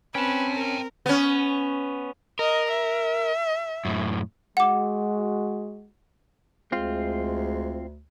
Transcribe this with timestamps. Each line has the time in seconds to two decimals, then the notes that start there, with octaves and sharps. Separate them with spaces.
0.15 C4 C#4 B4 G5 A5
0.56 A#4
1.06 B3 C#4
2.39 A#4 D#5
2.71 E5
3.85 F#2 A2
4.57 G#3 F#4 F#5 D6
6.72 D2 G#3 C4 F4